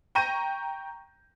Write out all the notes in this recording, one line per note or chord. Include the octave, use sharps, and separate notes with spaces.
G5 A#5 C#6 G6 A#6 D#7